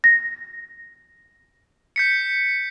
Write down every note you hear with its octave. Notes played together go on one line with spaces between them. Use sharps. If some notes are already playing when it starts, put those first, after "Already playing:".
A#6
G6 B6 C#7